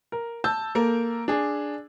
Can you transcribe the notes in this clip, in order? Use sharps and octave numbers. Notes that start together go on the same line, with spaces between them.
A#4
A5 E6 G6
A#3 A4 A#4
D4 G#4